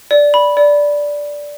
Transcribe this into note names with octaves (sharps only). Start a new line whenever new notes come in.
D5
B5
D5